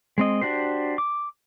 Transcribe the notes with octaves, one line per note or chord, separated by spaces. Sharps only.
G#3 C4 D#5
D4 F#4 G4 C5
D6